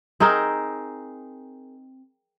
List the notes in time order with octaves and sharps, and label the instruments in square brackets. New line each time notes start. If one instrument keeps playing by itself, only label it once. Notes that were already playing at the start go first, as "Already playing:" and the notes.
[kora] C4 D#4 G#4 A#4